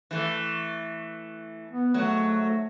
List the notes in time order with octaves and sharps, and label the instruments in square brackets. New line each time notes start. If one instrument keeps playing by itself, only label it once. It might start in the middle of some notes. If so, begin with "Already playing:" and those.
[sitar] E3 A3
[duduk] B3
[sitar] G#2 F#3 [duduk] A3